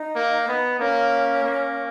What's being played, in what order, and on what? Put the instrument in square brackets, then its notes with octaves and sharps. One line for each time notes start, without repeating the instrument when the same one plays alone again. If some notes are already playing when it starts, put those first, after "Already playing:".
Already playing: [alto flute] D#4
[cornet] A#3
B3
[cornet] A#3 [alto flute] C#4
[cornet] A#3